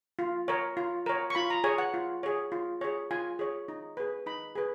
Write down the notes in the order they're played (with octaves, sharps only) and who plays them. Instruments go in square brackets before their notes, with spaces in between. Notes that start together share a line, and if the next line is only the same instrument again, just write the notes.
[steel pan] F4
A#4 C#5
F4
A#4 C#5
C#6
F4 B5
A#5
G#4 C#5 G#5
F#5
F4
G#4 C#5
F4
G#4 C#5
F4 G#5
G#4 C#5
D#4
G#4 B4
D#4 B5
G#4 B4